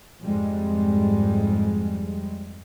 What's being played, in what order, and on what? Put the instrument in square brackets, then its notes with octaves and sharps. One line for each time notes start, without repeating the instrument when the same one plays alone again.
[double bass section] F2 G#2 G3 G#3